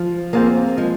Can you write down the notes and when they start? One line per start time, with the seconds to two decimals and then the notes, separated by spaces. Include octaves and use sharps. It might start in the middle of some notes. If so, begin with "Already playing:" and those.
Already playing: F3
0.33 A#3 C4 F4 G#4
0.77 F3 G#3